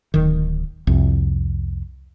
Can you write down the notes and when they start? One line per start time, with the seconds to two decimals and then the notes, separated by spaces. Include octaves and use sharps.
0.14 D1 D#3
0.87 C2 F2